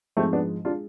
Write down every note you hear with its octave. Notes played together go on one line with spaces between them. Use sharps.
G#2 F3 G#3 A3 C4
B3 D4
G#3 D4 F4